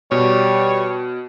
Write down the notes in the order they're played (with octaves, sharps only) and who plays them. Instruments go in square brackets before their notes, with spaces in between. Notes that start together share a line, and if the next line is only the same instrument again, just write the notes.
[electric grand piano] B2 [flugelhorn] G3 [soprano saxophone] C#5